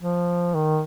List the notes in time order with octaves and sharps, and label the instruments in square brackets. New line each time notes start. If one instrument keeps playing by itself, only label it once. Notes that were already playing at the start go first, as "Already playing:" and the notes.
[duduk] F3
D#3